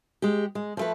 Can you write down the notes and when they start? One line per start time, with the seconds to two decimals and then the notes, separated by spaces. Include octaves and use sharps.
0.22 G#3 G4
0.55 G#3
0.77 F3 A3 B4